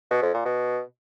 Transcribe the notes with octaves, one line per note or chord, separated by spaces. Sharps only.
B2
F2
A#2
B2